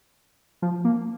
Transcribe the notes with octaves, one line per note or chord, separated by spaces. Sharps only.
F3
A#3